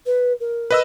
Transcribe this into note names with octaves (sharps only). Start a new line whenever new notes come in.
B4
A#4
B4 D#5 E6